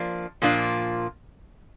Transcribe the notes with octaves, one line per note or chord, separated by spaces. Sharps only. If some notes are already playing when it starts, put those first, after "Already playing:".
Already playing: F3 A#3 D4 F4
A#2 F3 A#3 D4 F4